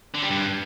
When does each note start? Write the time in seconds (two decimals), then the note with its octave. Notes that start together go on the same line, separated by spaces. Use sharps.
0.15 D3
0.22 G3
0.30 G2